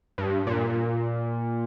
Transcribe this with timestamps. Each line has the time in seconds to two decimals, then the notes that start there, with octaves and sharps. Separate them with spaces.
0.18 G2
0.47 A#2